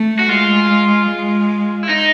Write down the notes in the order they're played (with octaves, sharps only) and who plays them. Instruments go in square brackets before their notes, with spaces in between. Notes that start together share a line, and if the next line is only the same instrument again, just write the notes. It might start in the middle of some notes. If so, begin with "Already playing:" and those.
Already playing: [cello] A3
[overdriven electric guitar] F#4
[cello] G#3 [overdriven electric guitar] F4
[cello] G#3
[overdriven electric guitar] E4
D#4